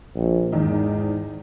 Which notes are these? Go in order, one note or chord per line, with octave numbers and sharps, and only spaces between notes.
A#1
E2 G#2 D#3 D#4